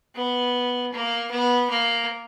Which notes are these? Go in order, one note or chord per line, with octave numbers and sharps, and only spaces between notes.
B3
A#3
B3
A#3